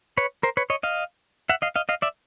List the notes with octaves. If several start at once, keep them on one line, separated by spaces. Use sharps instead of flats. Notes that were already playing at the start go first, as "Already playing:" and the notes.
B4 C#5
A#4 C5
B4 C#5
C#5 D#5
D#5 F5
E5 F#5
D#5 F5
D#5 F5
D#5 F5
D5 E5